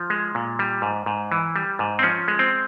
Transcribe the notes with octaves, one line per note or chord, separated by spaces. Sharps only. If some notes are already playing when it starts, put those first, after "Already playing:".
Already playing: F3
G#3
A#2
G3
G#2
G#2
E3
G3
G#2
C4
F3 C#4
G#3
C4